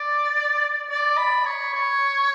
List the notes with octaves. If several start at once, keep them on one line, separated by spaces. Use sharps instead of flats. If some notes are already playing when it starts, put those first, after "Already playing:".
Already playing: D5
D5
B5
C#5
C#5